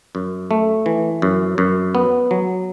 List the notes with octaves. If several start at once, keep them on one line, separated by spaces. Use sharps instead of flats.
F#2
A3
E3
F#2
F#2
B3
F#3